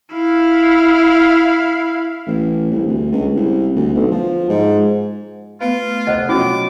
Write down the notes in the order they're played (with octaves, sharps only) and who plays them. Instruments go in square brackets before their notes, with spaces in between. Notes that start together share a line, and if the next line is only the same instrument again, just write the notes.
[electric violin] E4 F5
[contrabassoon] A1
C2
D2
C#2
C2
D2
B1
F3
G#2
[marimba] A3 B3 F5 [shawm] F4 [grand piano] B4
[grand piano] F1 [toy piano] C5 D#5 [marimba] F#5
[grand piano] B2 F3 F#3 [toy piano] C#4 F4 [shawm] D6